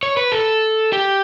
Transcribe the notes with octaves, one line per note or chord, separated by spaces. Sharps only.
C#5
B4
A4
G4